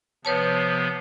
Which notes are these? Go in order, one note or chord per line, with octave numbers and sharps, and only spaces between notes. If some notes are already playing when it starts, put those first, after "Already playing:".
C3 F3 B3 B4 C#5 A5